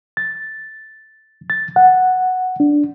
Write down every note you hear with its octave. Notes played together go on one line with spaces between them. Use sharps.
A6
A6
F#5
D4